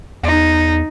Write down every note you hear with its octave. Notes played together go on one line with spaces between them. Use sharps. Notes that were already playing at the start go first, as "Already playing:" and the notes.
E2 D#4